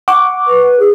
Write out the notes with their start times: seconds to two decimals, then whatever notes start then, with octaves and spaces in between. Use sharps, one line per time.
0.08 F#5 C#6 D6
0.47 B4
0.80 G#4